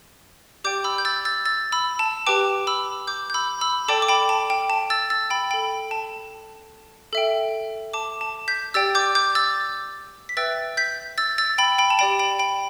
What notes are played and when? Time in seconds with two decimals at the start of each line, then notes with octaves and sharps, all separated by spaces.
0.64 G4 D5 G5 D6 G6
0.84 B5 E6
0.98 G6
1.05 E6 A6
1.25 E6 A6
1.45 E6 A6
1.72 B5 E6
1.99 A5
2.27 G4 B4 G5 A5 D6
2.67 B5 E6
3.07 D6 G6
3.30 G6
3.34 B5 E6
3.61 B5 E6
3.88 A4 D5 G5 A5 D6
4.02 D6
4.08 G5 B5
4.29 A5
4.50 G5
4.70 A5
4.90 E6 A6
5.10 E6 A6
5.30 G5 B5
5.51 A4 G5 B5
5.91 A5
7.13 A4 E5 G5
7.93 A5 D6
8.21 A5
8.48 G6 B6
8.74 G4 D5 G5 E6 A6
8.95 D6 G6
9.15 D6 G6
9.35 E6 A6
10.29 B6
10.37 B4 E5 G5 E6 A6
10.77 G6 B6
11.18 E6 A6
11.38 E6 A6
11.58 G5 B5
11.78 G5 B5
11.90 A5
11.99 G4 D5 G5 B5
12.19 G5 B5
12.39 G5 B5